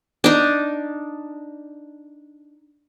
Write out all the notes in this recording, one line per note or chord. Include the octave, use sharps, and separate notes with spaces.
D4 D#4